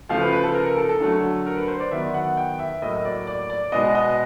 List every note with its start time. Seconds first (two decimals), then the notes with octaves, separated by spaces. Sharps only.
0.09 C#3 F3 A3 F5
0.21 B4
0.33 B4
0.44 A4
0.55 A#4
0.66 A#4
0.77 A4
0.89 A4
1.00 D3 F#3 A3
1.46 A#4
1.57 B4
1.68 C5
1.80 D5
1.91 D#3 F#3 B3 E5
2.14 F#5
2.37 G5
2.59 E5
2.82 A2 F#3 A#3 D#5
3.05 D5
3.27 D5
3.50 D5
3.72 B2 G#3 B3 D#5
3.95 D#5